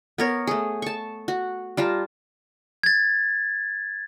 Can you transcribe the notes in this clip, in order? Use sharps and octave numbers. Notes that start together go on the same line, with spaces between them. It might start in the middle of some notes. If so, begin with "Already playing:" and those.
B3 A#4 C#5
A3 G#4
A5 C#6
F#4
G3 F4 A5 A#5
G#6 A6